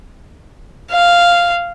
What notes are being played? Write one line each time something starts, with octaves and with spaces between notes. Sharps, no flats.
F5